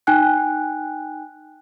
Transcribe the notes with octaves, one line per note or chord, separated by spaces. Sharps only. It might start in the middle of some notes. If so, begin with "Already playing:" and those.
D#4 G5 G#5 F#6